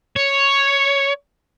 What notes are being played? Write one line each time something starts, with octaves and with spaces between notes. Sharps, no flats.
C#5